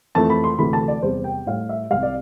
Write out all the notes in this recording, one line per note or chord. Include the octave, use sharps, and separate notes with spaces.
F2 E3 A3 A5
B5
C6
D2 C3 E3 A3 B5
A5
D5
E2 C3 G3 C5
G5
A2 G3 F5
E5
C2 C3 G3 F5
D5